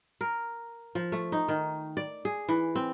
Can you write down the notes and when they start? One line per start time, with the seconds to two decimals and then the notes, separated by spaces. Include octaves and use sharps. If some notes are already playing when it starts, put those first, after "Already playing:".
0.21 A#4
0.95 F3
1.12 A3
1.32 D#4
1.49 D#3
1.97 D5
2.25 G#4
2.49 E3
2.75 C4